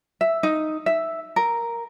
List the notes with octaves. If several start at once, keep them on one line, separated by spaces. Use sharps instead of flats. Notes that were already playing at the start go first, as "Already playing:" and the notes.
E5
D#4
E5
A#4